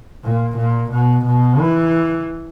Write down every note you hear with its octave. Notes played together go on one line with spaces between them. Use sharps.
A#2
A#2
B2
B2
E3